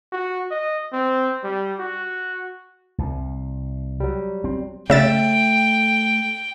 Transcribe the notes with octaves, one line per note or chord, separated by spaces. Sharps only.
F#4
D#5
C4
G3
F#4
C2
F#3 G3
C4
C#3 A3 E5 G5 A6